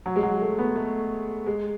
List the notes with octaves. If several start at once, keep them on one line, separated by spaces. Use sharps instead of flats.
F#3
G#3
F#3
A3
B3
A3
G#3